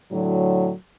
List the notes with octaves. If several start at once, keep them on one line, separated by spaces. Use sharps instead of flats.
A2 D3 F#3